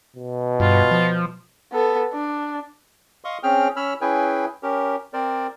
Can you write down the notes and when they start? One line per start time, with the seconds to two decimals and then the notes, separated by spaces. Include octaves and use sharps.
0.16 B2
0.60 G2 F4
0.91 F3
1.72 B3 A4
2.13 D4
3.24 D#5 F5 C6 C#6 D#6
3.43 C4 C#4 G#4 G5 F6
3.76 C#4 C#5 B5 E6 F6
4.01 C#4 E4 G#4 B4 G5 G#5
4.63 C#4 G4 A#4
5.13 C4 A#4 C5 D5